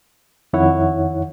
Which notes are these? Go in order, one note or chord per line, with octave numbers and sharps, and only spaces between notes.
F2 D#3 E4 C#5 F#5